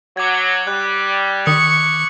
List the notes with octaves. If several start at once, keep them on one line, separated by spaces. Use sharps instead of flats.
F#3 D6 G#6
G3 F#6
D#3 C#6 D#6